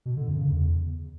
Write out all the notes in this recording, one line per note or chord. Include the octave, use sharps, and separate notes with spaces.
B2
D3
F#2
C#3
E2